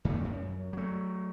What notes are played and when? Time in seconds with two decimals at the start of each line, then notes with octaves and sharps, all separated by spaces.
0.05 F#2 A#2 D#3 A3
0.24 F#2
0.73 F#3 A3